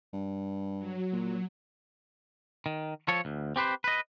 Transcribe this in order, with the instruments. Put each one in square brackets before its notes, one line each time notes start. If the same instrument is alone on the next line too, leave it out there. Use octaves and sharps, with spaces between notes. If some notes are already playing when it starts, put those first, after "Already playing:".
[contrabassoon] G2
[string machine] F#3
[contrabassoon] A#2
[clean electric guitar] D#3
F3 A4 C#5
D2
C4 G4 B4 C5
B4 D#5